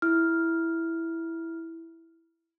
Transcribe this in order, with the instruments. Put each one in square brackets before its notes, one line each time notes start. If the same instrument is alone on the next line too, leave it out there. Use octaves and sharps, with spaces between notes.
[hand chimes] E4 F6